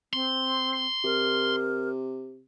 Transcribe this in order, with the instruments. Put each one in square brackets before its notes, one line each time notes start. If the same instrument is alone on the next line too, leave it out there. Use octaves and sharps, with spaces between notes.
[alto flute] C4 [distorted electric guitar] C6
[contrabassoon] C3 [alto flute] A#4